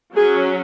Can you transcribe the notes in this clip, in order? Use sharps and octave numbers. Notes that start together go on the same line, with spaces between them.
F#3 G#4
C#4